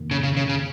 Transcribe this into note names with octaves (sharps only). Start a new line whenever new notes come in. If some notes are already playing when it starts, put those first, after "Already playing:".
Already playing: F2 C3 D#3 A#3
C#3
C#3
C#3
C#3